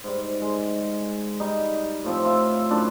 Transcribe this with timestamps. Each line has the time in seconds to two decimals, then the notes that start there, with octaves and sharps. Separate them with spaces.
0.04 G#2 G3
0.42 G#3
1.40 G3 D#4 D#5
2.04 A2 F3 C4
2.24 F4 E5
2.70 F#2 A2 D4 E4